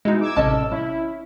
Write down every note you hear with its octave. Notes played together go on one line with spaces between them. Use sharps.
B2 G#3 D#4 E4
D6 E6 G#6
A1 C3 C#4 A4 D#5 A5 E6
C#4 E4